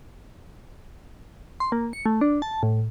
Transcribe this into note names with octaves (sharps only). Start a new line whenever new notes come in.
C6
A#3
C#7
A3
D4
A5
A2